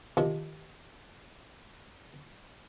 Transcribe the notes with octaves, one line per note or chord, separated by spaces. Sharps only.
C3 D#3 F3